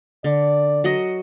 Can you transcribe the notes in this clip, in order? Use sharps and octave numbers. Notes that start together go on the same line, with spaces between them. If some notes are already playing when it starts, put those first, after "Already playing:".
D3 D5
F#3 F#4 D#5